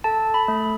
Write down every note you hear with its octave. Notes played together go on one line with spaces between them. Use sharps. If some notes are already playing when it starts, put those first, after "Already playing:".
A4 A5
B5
A3